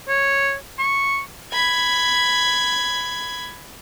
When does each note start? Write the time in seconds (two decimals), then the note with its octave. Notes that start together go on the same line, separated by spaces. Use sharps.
0.08 C#5
0.79 C#6
1.53 B5 G#6